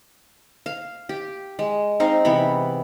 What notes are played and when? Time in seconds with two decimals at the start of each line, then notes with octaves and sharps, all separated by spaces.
0.66 F5
1.09 G4
1.59 G#3
2.00 C4 D#4 F5
2.25 C3 E3 B3 B5